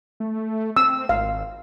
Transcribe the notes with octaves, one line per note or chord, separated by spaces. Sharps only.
A3
C4 E6
G#1 F5